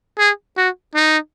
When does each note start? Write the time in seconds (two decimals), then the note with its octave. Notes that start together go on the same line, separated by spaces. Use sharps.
0.19 G#4
0.57 F#4
0.95 D#4